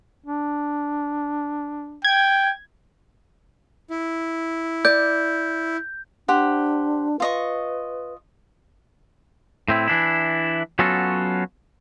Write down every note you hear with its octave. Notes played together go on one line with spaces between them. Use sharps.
D4
G5 G#6
E4
D5 G6
D4 G4 C5 F#5
F4 B4 D#5 C#6
A2 C4 E4
E3 D4 E4
F#3 B3 C#4 F4 F#4 A4